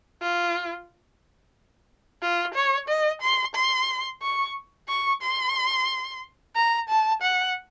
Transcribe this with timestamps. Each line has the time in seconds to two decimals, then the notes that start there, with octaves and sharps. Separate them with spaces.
0.22 F4
2.22 F4
2.54 C#5
2.88 D#5
3.22 C6
3.55 C6
4.22 C#6
4.89 C#6
5.22 C6
6.55 A#5
6.89 A5
7.22 F#5